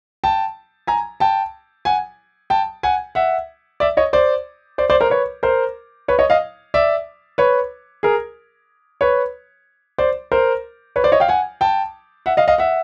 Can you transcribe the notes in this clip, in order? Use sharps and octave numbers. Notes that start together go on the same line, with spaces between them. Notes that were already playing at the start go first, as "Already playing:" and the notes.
G5 A5
G#5 A#5
G5 A5
F#5 G#5
G5 A5
F#5 G#5
E5 F#5
D5 E5
C#5 D#5
C5 D5
C5 D5
C5 D5
A#4 C5
B4 C#5
A#4 C5
B4 C#5
C#5 D#5
D#5 F5
D5 E5
B4 C#5
G#4 A#4
B4 C#5
C5 D5
A#4 C5
B4 C#5
C5 D5
C#5 D#5
F5 G5
F#5 G#5
G5 A5
E5 F#5
D#5 F5
D#5 F5
E5 F#5